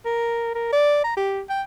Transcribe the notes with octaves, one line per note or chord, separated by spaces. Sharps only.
A#4
A#4
D5
A#5
G4
G5